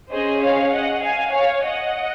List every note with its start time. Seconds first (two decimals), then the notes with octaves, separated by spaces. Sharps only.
0.11 C#4 G#4 C5 D#5
0.42 C#5 F5
0.73 D#5 F#5
1.03 F5 G#5
1.34 C#5 F5
1.64 D#5 F#5